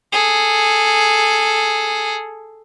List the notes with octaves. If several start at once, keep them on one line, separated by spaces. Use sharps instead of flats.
G#4 A4